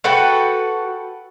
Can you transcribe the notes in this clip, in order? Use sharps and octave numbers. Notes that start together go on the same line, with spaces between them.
F#4 A4 B4 G5